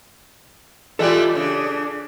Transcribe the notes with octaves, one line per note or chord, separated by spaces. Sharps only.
E3 G3 G#3 F4 G4 A4 D5
C#3 D4